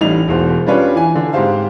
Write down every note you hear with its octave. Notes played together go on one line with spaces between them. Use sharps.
A1 G3 D#4 F7
E1 E2 B2 C5
G3 C#4 D4 F4 B4 C#5
E3 G#5
D3
G#2 C4 G4 C5 F5